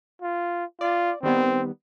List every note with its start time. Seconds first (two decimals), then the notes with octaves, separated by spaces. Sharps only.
0.22 F4
0.81 F4 D5
1.23 D#3 G3 B3 C4